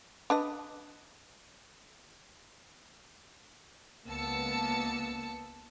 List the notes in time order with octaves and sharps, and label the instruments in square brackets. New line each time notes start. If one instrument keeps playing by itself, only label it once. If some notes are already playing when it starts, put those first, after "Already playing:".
[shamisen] D4 B4 D#5
[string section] C#2 A#3 B3 A5 E6 C#7